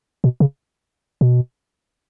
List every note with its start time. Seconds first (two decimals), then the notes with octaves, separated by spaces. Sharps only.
0.24 B2
0.40 C#3
1.21 B2